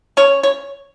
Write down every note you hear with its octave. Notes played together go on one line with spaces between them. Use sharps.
C#4 C#5
C#5